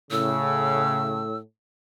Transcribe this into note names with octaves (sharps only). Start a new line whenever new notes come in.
A2 C#3 E6